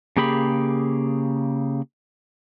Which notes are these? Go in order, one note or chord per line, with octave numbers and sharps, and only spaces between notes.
C#3 A#3 G4 G#4 B5